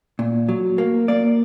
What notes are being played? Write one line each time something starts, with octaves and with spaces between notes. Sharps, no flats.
A#2
F#3
A#3
A#3 D5